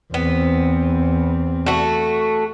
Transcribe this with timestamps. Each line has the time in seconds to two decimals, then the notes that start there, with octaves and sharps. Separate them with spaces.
0.14 E2 B3 C4
1.66 A3 F#4